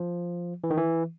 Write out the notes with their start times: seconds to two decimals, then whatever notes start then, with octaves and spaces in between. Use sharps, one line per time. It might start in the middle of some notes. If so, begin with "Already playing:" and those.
Already playing: F3
0.64 E3
0.70 D#3
0.78 E3